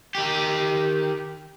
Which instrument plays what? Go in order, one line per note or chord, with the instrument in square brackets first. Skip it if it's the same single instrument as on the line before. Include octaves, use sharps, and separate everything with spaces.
[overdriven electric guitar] D#3 G4